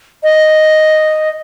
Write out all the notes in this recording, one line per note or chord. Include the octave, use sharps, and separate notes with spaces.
D#5